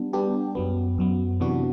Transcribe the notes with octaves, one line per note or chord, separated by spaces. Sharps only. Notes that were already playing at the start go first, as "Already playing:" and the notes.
Already playing: G3 B3 D4
G3 B3 D4 G4
F#2 F#3 B3
F#2 F#3 B3
C3 E3 B3 D4 F#4